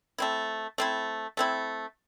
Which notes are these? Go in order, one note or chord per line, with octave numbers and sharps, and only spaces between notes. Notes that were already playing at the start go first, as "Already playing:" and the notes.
A3 C4 E4
A3 C4 E4
A3 C4 E4